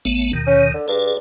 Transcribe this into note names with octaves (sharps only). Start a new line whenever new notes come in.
A1 A3 B3
D#2 B2 D#3
C#4
D3
G2 G#4 D5